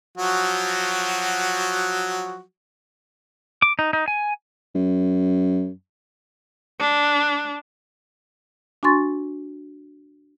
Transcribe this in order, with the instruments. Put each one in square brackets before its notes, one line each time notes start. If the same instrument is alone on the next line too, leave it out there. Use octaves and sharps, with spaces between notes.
[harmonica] F3 F#3 F#4
[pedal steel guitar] D6
D#4
D#4
G#5
[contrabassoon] F#2
[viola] D4
[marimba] D4 F#4 G#5 C6 C#6 A6